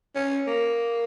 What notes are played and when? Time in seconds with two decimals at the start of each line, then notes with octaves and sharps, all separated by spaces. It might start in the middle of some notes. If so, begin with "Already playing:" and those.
0.15 C#4
0.47 A#3